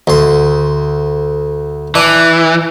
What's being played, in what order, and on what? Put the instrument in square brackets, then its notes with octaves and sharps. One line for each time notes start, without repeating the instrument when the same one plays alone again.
[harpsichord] D2 C6
[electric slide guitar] E3 [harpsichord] D4